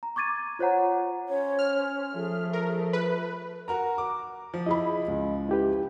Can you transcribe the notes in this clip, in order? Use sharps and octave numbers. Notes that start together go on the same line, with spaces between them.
A#5
C#6 D6 G#6 A6 D#7
F4 C5 C#5 F#5 A#5
C#4 C5 C#5
F6
F3 A3 G#4
A#4
B4
F#4 A#4 A#5
D6
F3
E4 G#4 D#5 B5
C#2
E4 G4 B4